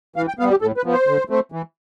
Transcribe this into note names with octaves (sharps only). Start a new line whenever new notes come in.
E3 F5
G5
G3 B3 F5
G4
A2 A4
B4
F3 B3
C5
D3
A3 C4
E3